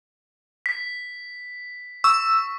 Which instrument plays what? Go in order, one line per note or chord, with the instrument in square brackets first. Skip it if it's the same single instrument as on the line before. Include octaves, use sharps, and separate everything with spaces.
[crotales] B6
[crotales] C#6 [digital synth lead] E6